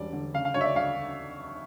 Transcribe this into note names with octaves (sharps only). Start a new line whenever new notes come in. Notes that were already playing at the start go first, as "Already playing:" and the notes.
Already playing: E1 G3 D5
D3
C#3 F5
F5
D2 C#5
E5
D5
D2 F5